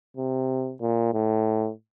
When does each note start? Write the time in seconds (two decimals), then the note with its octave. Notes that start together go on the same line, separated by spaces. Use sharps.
0.17 C3
0.81 A#2
1.13 A2